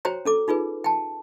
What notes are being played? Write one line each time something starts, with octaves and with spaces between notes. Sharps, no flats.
F#4 C5 C#5 G5 A#5
C#4 A4 D6
D#4 F4 G#4 B4
G5 A5